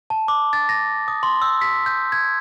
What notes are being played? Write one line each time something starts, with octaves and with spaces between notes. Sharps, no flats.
A5
D6
A6
A#6
D#6
C6
E6
B6
G6
G#6